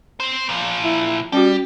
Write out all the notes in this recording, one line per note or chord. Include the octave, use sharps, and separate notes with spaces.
C4 C5
A#2 F3
E4
G3 C#4 F#4 G4